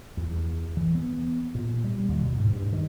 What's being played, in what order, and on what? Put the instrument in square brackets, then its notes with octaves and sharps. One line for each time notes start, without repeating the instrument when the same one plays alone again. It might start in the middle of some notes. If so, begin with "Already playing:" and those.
[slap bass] E2
E3
B3
A#2
G3
D#2
B2
G#2
G2
D#3